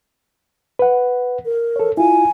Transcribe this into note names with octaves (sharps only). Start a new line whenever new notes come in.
B4 F#5
A#4
A4 C#5
E4 F4 G#5